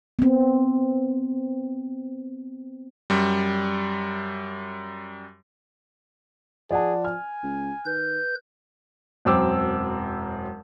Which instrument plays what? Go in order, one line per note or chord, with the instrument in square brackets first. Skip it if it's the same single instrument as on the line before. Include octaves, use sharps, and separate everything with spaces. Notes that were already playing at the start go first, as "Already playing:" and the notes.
[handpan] B3 C4
[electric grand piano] F#2 G3
[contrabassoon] F3 [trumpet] G#4 [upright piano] D5 F#5 A5
[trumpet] G#5 [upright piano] F6
[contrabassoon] C#2
[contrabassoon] D#3 [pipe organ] B4 G6
[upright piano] E1 F#2 C4 D6 E6